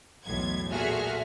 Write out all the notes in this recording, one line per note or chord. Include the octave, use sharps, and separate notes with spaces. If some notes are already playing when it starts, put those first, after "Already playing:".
B1 E2 A2 G#6
A#2 F#4 G#4 A4 E5 F6